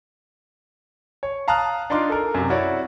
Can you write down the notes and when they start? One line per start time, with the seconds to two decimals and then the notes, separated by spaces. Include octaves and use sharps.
1.23 C#5
1.48 F5 A5 A#5 D#6 F6 F#6
1.90 D4 D#4 F4 C6 D6
2.10 A4 A#4
2.34 F#2 C3
2.50 E4 F#4 C#5 D5